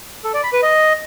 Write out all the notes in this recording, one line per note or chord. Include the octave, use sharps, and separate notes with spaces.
A4
D5
B5
B4
D#5